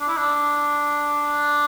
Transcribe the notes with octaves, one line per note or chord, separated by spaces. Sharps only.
D4
E4
D4